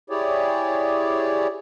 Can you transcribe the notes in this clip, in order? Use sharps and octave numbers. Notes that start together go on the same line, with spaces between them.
E4 G4 G#4 C#5 D5